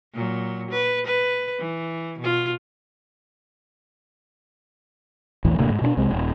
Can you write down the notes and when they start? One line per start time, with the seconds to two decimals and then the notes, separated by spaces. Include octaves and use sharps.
0.14 A#2 F#3
0.71 B4
1.07 B4
1.59 E3
2.19 B2 F4
5.45 A#1 E2 A2 E3
5.58 D1 D2 C3 A#3
5.70 G#2
5.82 B2 C4 D4
5.97 C2 C3 G#3
6.11 D#1